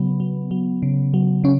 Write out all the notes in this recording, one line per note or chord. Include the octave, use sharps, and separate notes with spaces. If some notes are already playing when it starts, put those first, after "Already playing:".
Already playing: C#3 F#3 B3
F#3
F#3
C#3
F#3
C#3 C#4